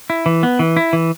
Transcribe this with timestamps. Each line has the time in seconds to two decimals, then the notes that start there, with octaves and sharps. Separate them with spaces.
0.10 E4
0.26 E3
0.43 B3
0.59 E3
0.77 E4
0.93 E3